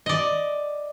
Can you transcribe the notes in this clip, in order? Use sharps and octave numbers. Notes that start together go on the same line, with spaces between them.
D5 D#5